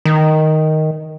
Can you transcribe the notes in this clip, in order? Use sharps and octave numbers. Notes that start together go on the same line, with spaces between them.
D#3